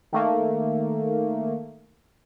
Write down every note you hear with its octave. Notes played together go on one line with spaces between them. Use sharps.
D#3 A3 A#3